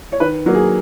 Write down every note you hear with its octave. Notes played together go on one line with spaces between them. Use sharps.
C#5
D#3 B4
F#3 A#3
G#4